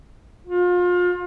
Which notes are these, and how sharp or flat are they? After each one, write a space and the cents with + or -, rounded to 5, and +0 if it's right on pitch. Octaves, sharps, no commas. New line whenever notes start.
F4 +30